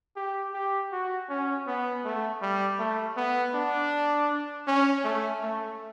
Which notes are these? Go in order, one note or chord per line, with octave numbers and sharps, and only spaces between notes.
G4
G4
F#4
C#4
B3
A3
G3
A3
B3
D4
C#4
A3
A3